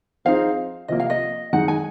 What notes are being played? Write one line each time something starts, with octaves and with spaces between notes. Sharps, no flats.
F3 C4 D#4 G#4 F5
C3 F3 A#3 D#5
F5
D#5
F#2 D#3 G#3 D#4 F#5
G#5